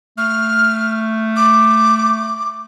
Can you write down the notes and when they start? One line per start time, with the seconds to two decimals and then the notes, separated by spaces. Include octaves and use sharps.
0.18 A3 F6
1.36 D6